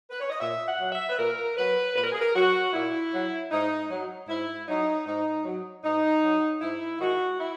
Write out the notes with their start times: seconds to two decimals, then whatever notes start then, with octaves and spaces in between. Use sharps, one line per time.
0.10 B4
0.20 C#5
0.30 D#5
0.41 A#2 E5
0.66 F#5
0.79 F#3
0.93 E5
1.08 B4
1.18 A#2 A#4
1.57 F#3 B4
1.95 A#2 B4
2.04 A#4
2.12 G#4
2.20 A#4
2.34 F#3 F#4
2.73 A#2 E4
3.12 F#3
3.51 G#2 D#4
3.91 F#3
4.28 G#2 E4
4.68 F#3 D#4
5.06 G#2 D#4
5.45 F#3
5.84 G#2 D#4
6.23 F#3
6.61 G#2 E4
7.00 D#3 G#3 F#4
7.39 E4